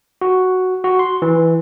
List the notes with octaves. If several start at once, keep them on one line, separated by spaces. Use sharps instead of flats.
F#4
F#4
C6
E3